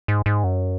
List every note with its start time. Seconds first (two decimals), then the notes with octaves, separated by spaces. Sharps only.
0.08 G#2
0.26 G#2
0.44 F#2